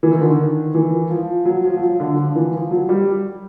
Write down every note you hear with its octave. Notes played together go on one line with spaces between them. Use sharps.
E3
D#3
D3
D#3
E3
F3
F#3
F3
F#3
F3
D3
F3
E3
F3
F#3
G3